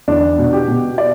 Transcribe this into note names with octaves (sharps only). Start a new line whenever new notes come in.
E2 D4
B2
G4
B2
D5